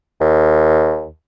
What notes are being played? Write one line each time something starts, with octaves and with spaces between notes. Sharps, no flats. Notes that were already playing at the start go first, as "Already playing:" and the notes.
D#2